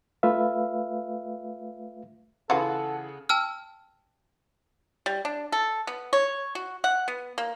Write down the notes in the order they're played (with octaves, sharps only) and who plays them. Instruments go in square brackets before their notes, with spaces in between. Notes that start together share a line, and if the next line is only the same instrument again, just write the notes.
[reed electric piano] A3 F4 B4 E5 F5
[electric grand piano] C#3 G#4 F#5 [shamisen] E3 F4 F#4 [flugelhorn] A4
[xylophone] G5 A5 E6 F6
[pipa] G3
D4
A4
B3
C#5
F#4
F#5
B3
A#3